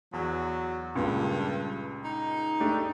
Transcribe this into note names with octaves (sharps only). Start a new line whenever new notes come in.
E2 F#3
C#2 G2 A#2
D#4
A3 D4 G4